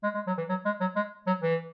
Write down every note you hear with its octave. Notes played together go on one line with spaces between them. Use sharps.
G#3
G#3
F#3
E3
F#3
G#3
F#3
G#3
F#3
E3